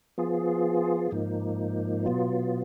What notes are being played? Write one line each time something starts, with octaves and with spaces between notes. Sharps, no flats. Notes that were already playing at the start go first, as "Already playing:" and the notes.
F3 B3 F4 G#4
G#2 F3 A#3 D#4
B2 F#3 B3 F4